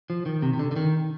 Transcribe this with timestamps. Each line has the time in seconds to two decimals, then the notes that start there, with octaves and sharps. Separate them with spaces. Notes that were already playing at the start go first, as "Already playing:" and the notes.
0.10 F3
0.26 D#3
0.42 C3
0.54 C3
0.59 D3
0.71 D3
0.76 D#3